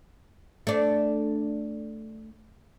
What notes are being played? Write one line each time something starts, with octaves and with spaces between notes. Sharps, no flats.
A3 D4